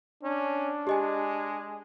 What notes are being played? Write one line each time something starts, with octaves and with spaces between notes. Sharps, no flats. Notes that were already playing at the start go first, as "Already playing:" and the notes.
C#4 D4
G#3 G4 D#5 G#5